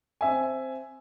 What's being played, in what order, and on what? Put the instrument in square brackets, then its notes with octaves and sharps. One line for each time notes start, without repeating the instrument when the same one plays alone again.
[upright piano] C4 E5 G#5